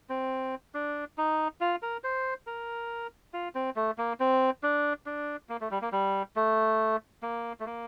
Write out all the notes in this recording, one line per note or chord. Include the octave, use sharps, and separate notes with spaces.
C4
D4
D#4
F4
A#4
C5
A#4
F4
C4
A3
A#3
C4
D4
D4
A#3
A3
G3
A#3
G3
A3
A#3
A3
A#3